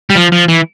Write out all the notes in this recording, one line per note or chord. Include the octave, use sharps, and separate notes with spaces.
G3
F3
F3
E3